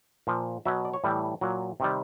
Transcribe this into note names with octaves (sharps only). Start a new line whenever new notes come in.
A#2 F3
B2 F#3 E5
D5
C#5
A2 E3 G3
A#2 F#3
C3 D#3 G3